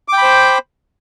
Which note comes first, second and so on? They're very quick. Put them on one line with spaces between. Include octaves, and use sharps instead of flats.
D6 G5 B5 C5